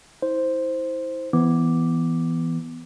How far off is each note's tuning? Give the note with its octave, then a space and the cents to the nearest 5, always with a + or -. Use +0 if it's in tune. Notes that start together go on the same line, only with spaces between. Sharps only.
E4 -30 C5 +0
E3 +0 B3 +0 D6 +0